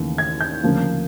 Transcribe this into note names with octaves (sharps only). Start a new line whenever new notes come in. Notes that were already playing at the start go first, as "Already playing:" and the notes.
Already playing: D#2 C#3 E3 A3
G#6
G6
D2 C#3 F3 A#3